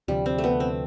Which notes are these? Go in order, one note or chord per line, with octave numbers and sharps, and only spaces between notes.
D2 C3 F3 G3
C4
A3
B3
C4